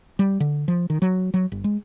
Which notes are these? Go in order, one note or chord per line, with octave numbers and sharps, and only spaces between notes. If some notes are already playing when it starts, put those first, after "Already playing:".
G3
D3
F3
D#3
F#3
F#3
G1
G#3